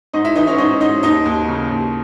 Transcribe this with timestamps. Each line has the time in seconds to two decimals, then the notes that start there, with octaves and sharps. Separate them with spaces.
0.13 G#2 D#4 D#5
0.24 E4 E5
0.35 E3 D#4 D#5
0.47 C#4 C#5
0.58 G#2 D#4 D#5
0.80 G#2 D#4 D#5
1.03 D#2 D#4 D#5
1.25 D#2
1.48 C#3
1.71 D#2